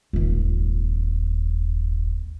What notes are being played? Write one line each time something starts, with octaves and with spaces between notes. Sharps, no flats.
D#1 G#1